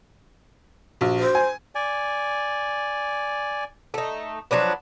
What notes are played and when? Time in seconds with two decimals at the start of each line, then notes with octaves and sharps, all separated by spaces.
1.01 A#1 F#4
1.19 C5
1.35 G#5
1.75 D5 G#5
3.94 A3 D#4
4.51 F3 F#3 D4 B4